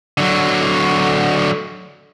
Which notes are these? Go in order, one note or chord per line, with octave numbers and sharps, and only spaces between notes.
D3 F#3